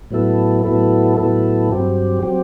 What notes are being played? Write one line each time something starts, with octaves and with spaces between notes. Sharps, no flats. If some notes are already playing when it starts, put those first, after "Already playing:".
A2 F#3 B3 E4 A4
A2 F#3 B3 E4 A4
A2 F#3 B3 E4 A4
G2 F#3 C4 G4
F#3 C4 G4